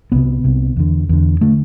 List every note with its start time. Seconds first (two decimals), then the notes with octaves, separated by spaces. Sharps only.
0.12 C2 C3 B3
0.44 C2 C3
0.76 E2 D3
1.09 E2 D3
1.41 D3 A3